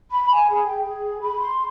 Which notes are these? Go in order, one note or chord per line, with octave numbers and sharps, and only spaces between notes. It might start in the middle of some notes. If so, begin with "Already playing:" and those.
B5
G#5
G#4
G5
G#4
B5
C6